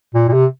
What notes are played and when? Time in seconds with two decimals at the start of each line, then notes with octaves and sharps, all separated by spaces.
0.14 A#2
0.28 A#2
0.33 C3